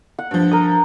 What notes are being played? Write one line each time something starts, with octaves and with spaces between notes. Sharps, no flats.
F#5
G2 F3
A#4 D#6